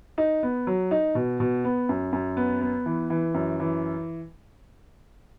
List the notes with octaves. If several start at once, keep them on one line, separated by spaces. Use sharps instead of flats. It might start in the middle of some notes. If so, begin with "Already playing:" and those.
D#4
B3
F#3
D#4
B2
B2
B3
F#2
F#2
B3
B3
E3
E3
F#2
E3